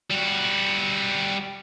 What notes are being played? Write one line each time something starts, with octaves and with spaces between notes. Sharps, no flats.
G3 F#4